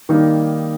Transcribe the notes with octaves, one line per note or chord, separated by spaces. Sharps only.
D#3 G3 A#3 D#4